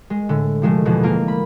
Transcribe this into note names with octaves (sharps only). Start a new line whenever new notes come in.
G#3
A2 D3
C3 F3 G#3 A3
E2 B2 F3
A#3 F4 A#4
B5